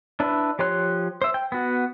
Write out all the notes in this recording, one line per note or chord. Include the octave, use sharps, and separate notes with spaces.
D4 E4 B4
F3 G4 C#5 C6 F#6
C5 E5
G5
B3 F#4